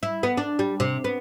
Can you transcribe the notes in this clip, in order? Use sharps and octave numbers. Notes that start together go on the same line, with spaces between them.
E4
B3
D4
G3
C3
B3